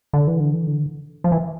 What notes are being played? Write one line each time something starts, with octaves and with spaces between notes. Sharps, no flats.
D3
E3
D3
E3
D3
F3
E3